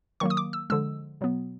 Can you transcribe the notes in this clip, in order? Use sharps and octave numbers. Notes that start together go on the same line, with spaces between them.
D#3 F#3 A#3 C#6
D#6
D6
E6
D3 F3 G#3 E6
B2 F#3 B3